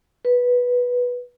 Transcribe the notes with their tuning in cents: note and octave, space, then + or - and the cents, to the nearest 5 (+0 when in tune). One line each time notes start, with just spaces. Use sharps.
B4 -10